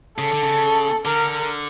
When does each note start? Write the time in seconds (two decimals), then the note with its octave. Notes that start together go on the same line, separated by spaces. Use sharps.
0.18 C#3 A4
0.31 D3
0.43 C#3
1.05 D3 A#4